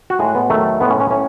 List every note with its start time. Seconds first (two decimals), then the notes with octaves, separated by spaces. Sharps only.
0.10 F#4
0.19 A2 G#3 G#4
0.35 B3
0.50 E2 D#3 F#3 A3
0.80 A2 G#3 B3
0.90 C#4
1.00 C#4
1.11 A2 C#4